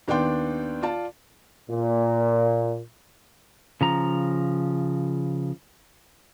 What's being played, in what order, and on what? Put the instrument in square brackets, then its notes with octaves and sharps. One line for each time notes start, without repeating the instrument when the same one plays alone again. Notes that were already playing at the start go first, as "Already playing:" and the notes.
[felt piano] D#2 B3 D4 D5 G5 C6
F4 D5 A5
[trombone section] A#2
[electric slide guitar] C#3 F3 A#5